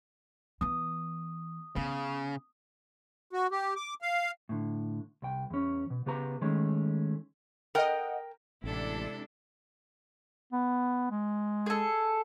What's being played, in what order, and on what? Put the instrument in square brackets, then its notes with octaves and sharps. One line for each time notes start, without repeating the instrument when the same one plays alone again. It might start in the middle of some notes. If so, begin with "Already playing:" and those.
[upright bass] E3 B3 [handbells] D#6
[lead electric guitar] C#3 [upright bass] B3
[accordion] F#4
G4
D6
F5
[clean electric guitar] A2 D3
C2 G5
E2 C#4
B2
C#3 B3 G4 B4 A#5
D#3 G#3 A3 C#4
[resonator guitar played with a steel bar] A#4 G5 [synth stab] D#5 F#5
[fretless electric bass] A1 [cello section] C3 G#3 D4 [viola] E4 A4
[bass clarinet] B3
G#3
[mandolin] G#4 A4